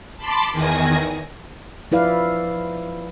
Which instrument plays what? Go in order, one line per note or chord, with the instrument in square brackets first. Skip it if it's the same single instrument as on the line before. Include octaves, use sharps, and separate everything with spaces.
[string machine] A5 B5 C6 D6
E2 D#3 G#5 A#6
[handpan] F3 E4 B4 D5 F5